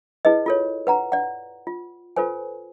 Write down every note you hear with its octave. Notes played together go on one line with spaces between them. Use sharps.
E4 G#4 B4 D#5
F4 A4 C#5
B4 F#5 A#5
D5 F#5
F4
F4 A4 B4 C5 G#5